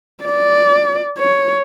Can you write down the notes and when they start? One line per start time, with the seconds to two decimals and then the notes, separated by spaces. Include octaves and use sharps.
0.23 D5
1.18 C#5